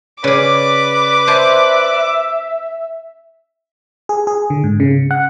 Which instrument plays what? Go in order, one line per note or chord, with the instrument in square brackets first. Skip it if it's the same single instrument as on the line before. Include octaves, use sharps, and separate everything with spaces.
[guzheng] C#3 G#4 [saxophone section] B4 D5 [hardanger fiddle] D6
[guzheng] C5 G#5 A5 [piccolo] E5
[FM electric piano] G#4
G#4
D3
G#2
C#3
F#5